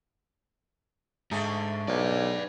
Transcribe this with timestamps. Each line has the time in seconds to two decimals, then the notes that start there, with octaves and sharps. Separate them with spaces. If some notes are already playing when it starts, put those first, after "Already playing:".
1.31 G#2 D3 A3 G#4
1.88 B1 B4 D5